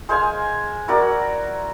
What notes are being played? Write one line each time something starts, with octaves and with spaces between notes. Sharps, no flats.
G#3 C5 F5 G#5
E4 F#4 A#4 D5